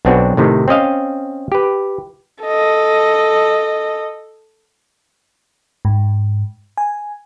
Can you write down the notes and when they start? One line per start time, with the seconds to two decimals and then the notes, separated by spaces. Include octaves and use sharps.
0.05 B1 B3 C4 D4 F#4 G#5
0.37 A2 C3 D#3
0.68 C4 C#4 D#5 F5
1.52 G4 B4
2.44 A4 D#5
5.85 G#2
6.77 G#5